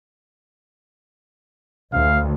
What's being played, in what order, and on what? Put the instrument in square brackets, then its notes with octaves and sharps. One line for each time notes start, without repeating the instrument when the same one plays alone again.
[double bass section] D2 [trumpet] F5